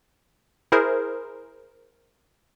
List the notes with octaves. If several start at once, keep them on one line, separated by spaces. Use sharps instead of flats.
E4 G#4 A#4 C5